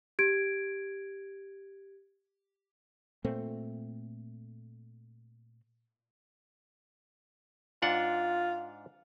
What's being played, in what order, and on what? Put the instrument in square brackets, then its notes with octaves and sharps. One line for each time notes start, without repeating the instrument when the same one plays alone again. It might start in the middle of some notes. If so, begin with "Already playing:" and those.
[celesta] G4 G#6 D7
[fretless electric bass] A#2 A3 C4
[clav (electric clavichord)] G#2 D4 F#5 [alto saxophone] F4